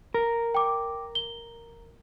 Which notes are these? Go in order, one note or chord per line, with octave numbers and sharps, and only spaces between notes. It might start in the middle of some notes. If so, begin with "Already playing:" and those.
A#4
G5 D6
G7